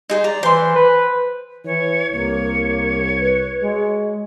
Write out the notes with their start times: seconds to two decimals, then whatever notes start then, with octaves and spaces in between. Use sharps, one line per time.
0.09 D#4 G#4 C5
0.24 D5 A#5
0.43 E3 C5 C6
0.76 B4
1.65 E3 C#5
2.12 C2 A#3 C#5
3.20 B4
3.62 G#3 F#4